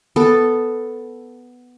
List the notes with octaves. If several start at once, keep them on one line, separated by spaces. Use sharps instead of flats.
B3 A4